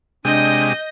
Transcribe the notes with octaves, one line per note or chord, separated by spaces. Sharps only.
C3 G#3 D4 G4 D#5 G6 D#7